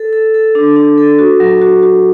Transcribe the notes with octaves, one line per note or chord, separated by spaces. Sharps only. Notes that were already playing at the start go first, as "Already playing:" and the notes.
Already playing: A4
A4
A4
D4
D4
A4
F#4
F#3
F#4
F#4